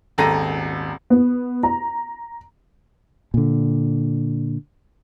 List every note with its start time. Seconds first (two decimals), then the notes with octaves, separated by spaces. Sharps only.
0.18 D#1 G#1 A4 A#5 A#6 D#7
1.10 B3
1.63 A#5
3.34 A#2 D3